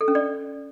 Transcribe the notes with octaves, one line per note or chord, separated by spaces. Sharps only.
A4
C#4
D5